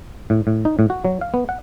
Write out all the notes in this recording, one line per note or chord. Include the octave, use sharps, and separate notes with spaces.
A2
A2
D#4
A2
F#4
F#3
F5
B3
F#5